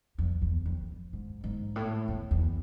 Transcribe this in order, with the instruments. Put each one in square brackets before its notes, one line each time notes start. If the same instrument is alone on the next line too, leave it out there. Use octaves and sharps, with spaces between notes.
[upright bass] F2
E2
F2
G#2
G#2
A2
E2
E2